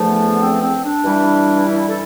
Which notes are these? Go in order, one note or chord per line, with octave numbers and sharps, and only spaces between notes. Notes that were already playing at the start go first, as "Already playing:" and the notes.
Already playing: E2 D3 F3 A3
B3
C4
C4
D4
G2 E3 G3
E4
A4